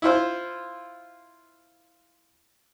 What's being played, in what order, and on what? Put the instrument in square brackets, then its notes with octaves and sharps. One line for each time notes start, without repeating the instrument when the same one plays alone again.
[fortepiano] E4 F4 C5